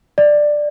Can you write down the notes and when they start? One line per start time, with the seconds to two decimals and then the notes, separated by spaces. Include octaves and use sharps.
0.18 D5